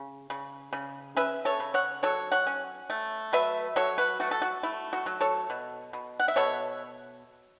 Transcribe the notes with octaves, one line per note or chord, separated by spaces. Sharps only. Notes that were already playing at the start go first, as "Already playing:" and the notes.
Already playing: C#3
C#3
C#3
C#4 B4 E5
A4 C#5
C#3
C#5 F#5
F#3 A4 C#5
C#5 F#5
C#4
A3
F#3 B4 E5
F#3 A4 C#5
F#4 B4
A3 F#4
A4
F#4
A3 E4
F#4
F#3
A4 C#5
B2
B2
F#5
E5
B2 A4 C#5